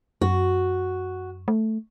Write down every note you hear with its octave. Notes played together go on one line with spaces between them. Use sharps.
F#2 F#4
A3